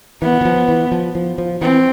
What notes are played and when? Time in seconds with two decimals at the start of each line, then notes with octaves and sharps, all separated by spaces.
0.22 E3 B3
0.41 E3
0.45 F3
0.68 E3
0.92 F3
1.15 F3
1.38 F3
1.61 E3 C4